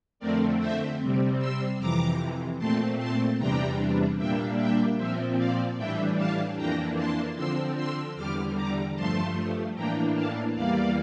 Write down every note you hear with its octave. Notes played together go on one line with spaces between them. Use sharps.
F2 D3 A3 C4 A#4 D5
C5 E5
C3 G3 C4
C6 E6
F2 C3 E3 A#5 D6
A#2 A3 C4 A5 C6
A5 C6
E2 C3 E3 G3 D4 G5 A#5
A#2 G3 A#3 D4 E5 G5
E5 G5
A#2 F3 C4 C5 E5
D5 F5
A2 E3 G3 D4 E5 G5
F5 A5
F2 E3 A#3 D4 G5 A#5
A5 C6
D3 F3 C4 C6 E6
C6 E6
E2 D3 G3 D6 F6
A#5 D6
G2 F3 A3 A5 C6
A2 E3 A#3 D4 G5 A#5
F5 A5
E2 E3 G3 A#3 D5 F5